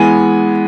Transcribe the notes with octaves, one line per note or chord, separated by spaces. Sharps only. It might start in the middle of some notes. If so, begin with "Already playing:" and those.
Already playing: E3 G#3 B3 G#5